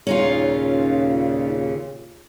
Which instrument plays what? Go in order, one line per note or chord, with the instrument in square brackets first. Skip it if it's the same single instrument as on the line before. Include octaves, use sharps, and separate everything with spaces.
[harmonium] D#2 A#2 C#3 [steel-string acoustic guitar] C#4 D#4 F4